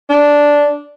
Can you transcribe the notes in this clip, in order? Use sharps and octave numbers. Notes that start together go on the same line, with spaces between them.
D4